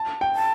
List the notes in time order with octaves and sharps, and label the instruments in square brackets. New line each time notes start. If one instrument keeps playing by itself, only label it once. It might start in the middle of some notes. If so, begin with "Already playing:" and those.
Already playing: [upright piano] A5
G5
[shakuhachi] A5